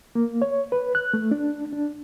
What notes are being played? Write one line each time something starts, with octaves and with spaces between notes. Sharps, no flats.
A#3
C#5
B4
F#6
A3
D4
D4